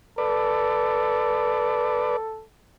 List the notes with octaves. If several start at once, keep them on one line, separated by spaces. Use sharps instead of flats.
A4 B4 D5